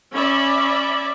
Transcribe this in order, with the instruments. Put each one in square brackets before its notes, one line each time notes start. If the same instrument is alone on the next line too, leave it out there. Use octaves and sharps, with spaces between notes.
[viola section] C#4 D5 E5 B5